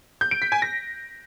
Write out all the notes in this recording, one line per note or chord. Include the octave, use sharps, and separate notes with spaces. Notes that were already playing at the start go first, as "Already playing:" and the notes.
G6
D7
B6
G#5
A#6